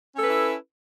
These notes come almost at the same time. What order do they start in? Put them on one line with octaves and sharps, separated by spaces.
C#4 A4 B4 E4